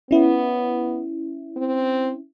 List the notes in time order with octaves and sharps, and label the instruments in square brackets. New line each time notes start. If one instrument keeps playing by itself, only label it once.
[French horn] B3 [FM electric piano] C#4 E4
[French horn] C4